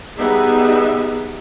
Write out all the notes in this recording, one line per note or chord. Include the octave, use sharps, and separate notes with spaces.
G3 B3 D#4 G4 G#4 E5